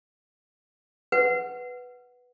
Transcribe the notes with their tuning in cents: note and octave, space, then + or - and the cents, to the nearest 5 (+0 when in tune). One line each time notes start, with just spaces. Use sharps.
B4 +0 F#5 +0